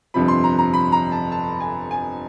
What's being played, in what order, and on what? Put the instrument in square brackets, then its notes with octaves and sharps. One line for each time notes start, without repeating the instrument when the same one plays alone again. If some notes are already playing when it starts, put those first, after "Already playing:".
[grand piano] G1 F2 C3 F3 B5
C6
A#5
A#5
B5
A#5
A5
A5
G#5
G#5